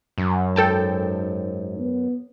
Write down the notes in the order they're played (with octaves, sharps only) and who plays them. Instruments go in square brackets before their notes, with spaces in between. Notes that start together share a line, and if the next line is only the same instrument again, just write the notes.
[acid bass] F#2
[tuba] G#2 [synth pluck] A4 G5 A5
[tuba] B3